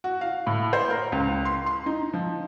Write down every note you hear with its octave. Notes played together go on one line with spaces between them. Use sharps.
F#4
F5
A2
C5
A#4
C#2
C6
C6
D#4
F3